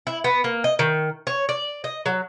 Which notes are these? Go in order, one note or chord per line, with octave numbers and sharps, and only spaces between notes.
E4
B3
A#3
D#5
D#3
C#5
D5
D#5
F#3